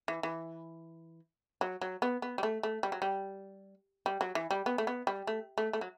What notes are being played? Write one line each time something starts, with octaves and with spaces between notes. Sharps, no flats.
E3
E3
F#3
F#3
B3
B3
G3
A3
A3
G3
F#3
G3
G3
F#3
E3
G3
B3
A3
B3
G3
A3
A3
A3
F#3